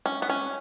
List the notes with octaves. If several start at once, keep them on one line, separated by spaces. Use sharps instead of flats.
C#4
B3
C#4